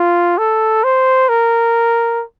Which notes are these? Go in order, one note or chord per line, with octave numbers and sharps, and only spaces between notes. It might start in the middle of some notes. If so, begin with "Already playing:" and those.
Already playing: F4
A4
C5
A#4